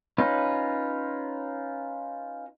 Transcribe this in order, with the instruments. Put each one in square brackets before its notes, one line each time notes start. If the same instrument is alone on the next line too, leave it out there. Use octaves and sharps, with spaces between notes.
[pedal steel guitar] C#4 D#4 F4 B4